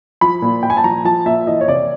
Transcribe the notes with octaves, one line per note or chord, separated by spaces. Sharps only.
F3 B5
A#2
A#2 G5
G#5
A5
F3 A#5
F3 A5
A#2 E5
E3 D#5
C#5
C3 D5